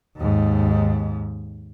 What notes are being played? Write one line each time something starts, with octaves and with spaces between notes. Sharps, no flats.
D#2 G#2